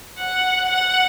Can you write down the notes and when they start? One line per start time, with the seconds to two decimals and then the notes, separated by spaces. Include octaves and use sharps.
0.18 F#5
0.69 F#5